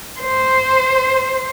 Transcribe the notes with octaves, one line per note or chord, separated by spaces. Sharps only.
C5